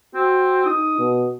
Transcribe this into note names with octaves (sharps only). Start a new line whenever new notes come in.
C4 F#4
D#4 D#6
B2